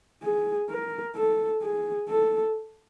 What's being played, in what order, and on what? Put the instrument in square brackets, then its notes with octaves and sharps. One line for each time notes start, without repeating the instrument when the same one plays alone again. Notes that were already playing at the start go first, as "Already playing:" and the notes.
[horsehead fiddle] G#4
A#4
A4
G#4
A4